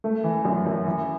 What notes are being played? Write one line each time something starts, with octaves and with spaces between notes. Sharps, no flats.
A3
E3
F#2
F#2
E3